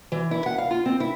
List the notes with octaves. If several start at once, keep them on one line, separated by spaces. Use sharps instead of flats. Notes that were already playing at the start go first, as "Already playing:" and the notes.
E3
E4
F#5
F5
F4
C4
E4